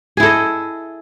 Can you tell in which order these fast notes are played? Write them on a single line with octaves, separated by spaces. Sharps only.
G#4 E4 A4 D#5